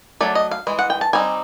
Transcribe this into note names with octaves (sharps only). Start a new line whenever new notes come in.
F#3 A3 D5
D#5
F5
E3 G#3
F#5
G5
A5
G3 C4 D#4 G#5